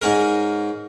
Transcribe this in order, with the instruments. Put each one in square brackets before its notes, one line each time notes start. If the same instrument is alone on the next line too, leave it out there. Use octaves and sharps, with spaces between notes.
[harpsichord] G#2 C#4 A#4